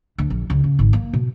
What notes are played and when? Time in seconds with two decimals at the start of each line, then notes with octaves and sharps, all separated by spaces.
0.18 D2
0.30 A#1
0.50 C#2
0.64 C#3
0.79 G#1
0.93 A#3
1.13 B2